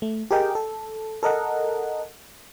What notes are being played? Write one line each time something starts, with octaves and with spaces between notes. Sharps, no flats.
A3
G4 G#4 A#4 D#5 G5
A4
A4 A#4 D#5 F#5